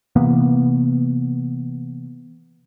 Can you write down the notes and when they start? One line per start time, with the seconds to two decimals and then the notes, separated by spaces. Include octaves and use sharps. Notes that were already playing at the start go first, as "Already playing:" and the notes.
0.16 C3 E3 A#3 B3